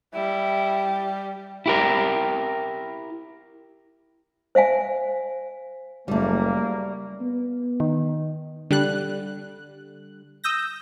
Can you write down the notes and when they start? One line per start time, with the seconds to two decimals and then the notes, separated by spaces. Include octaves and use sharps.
0.14 G3 E4
1.66 E4 G4 A#4
4.55 C5 E5 F5 G#5
6.08 F#1 G3 A3 A#3
7.21 B3
7.80 D#3
8.70 D3 G3 F#6
10.44 D#6 E6 G6 A#6